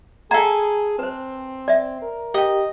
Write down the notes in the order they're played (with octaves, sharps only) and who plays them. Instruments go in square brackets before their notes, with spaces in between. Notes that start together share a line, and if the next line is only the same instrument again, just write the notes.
[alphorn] G#4 [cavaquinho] A4 G#5 [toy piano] F5 F#5 A#5
[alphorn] C4 [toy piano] B4 C5
[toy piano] D5 E5
[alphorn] A#4
[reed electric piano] G4 G5 [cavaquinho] D#5